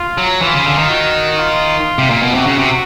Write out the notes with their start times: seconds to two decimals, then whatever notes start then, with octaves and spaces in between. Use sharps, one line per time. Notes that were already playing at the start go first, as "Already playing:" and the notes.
Already playing: F4
0.18 F#3
0.42 E3 F4
0.54 C#3
0.66 D3
0.78 D#3
0.90 F#4
1.38 F4
1.98 C3
2.10 A#2
2.22 B2
2.35 C3 F#4
2.47 C#3
2.59 C3